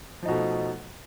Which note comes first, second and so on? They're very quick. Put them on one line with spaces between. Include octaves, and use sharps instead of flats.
F3 D#4 B2 A3